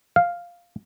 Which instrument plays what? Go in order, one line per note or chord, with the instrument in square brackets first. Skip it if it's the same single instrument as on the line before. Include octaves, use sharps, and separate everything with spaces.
[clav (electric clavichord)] F5